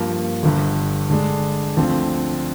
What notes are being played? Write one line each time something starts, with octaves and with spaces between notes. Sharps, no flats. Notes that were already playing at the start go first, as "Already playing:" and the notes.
Already playing: G2 F3 A#3
G1 G2 D3
D3 G#3 D4
D2 D3 F3 C4